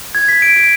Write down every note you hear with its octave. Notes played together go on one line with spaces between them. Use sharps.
G#6
B6
D7
D7